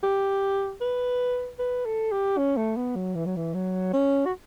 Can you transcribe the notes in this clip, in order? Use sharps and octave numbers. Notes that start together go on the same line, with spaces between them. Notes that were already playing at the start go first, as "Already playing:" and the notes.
G4
B4
B4
A4
G4
C#4
A3
B3
F#3
E3
F#3
E3
F#3
C#4
F#4